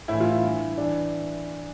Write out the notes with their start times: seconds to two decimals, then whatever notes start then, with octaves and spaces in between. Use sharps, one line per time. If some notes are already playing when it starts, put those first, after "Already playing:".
0.08 A2 E3 E4
0.20 F4
0.32 E4
0.43 G2 E3
0.78 E3 D4